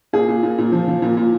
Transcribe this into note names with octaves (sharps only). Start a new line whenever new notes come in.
A#2 G#4
A#2
A#2
A#2
F3
F3
A#2
A#2